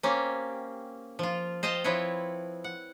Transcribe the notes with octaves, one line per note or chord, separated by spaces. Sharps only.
A#3 C4 C#4 G4
F3 F4
C5 D#5 F5 G5 A5
F3 C4 E4 B4 C#5
F#5